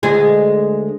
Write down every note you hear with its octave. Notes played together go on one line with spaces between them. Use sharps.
D2 G#3 G#4